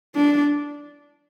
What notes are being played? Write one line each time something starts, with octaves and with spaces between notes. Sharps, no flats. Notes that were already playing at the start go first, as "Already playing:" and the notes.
D4